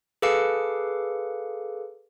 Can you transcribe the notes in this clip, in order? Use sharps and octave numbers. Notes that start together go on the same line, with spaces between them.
G#4 A4 B4 F5 D6 C#7